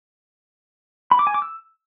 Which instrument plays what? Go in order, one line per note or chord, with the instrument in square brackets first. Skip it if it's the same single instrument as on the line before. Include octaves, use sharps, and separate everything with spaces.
[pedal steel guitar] B5
D6
G#5
D6
E6